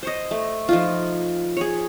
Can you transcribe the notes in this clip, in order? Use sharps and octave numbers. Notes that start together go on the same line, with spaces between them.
C5 C#5 D#5
A3
F3 D#4 F4
G#4 C#5